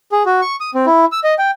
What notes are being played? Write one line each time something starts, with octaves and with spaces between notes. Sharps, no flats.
G#4
F#4
C#6
D#6
C4
E4
E6
D#5
G5